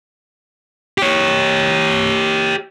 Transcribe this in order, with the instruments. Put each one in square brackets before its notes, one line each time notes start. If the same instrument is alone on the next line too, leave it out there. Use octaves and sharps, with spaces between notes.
[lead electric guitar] G4 C#5